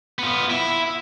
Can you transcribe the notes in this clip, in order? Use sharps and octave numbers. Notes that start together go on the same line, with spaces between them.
B3 F4
E4